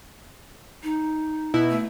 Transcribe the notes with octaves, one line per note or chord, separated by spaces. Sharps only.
D#4
B2 E4
A3